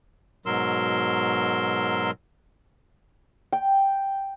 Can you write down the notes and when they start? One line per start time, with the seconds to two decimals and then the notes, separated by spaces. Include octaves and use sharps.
0.46 G#2 B2 F#3 A#4 C6 E6
3.52 G5